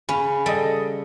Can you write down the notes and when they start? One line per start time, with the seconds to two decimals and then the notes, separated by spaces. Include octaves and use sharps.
0.09 C#3 C#4 B5
0.46 G3 A4 D#5